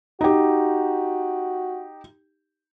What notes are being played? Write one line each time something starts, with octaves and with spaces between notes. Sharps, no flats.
D#4 F#4 G4